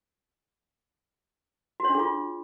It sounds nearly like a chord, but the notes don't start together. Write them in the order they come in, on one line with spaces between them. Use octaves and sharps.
F#4 C#5 D4 G#4 F4